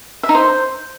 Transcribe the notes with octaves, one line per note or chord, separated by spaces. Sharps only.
E5
D#4
C5